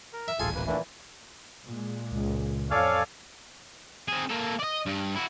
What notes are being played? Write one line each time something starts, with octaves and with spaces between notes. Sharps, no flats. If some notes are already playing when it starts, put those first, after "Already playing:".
A#4
E5
D#1 A1 F4 G#4 A4 G#5
C3 A#3 B4
A#2 D3 E3 A3 D4
A#2 G#3
C#2
A1 F2 A4 C#5 D5 F5 G#5
C4 G#4
A#3 A4
D5 D#5
G2
E4 F#4